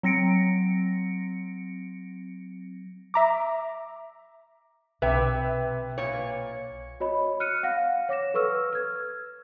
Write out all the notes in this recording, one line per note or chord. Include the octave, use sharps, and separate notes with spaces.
F#3 C4 A#6 C#7 D7
E5 A#5 D6
B1 C3 B4 E5 G5
A#2 C#5
F#4 C#5 D#5 B5
F6 F#6 C#7 D#7
F5 F#5 A#6
C#5 D6 A#6 E7
A4 B4 C#6 E6 F6
F6 G#6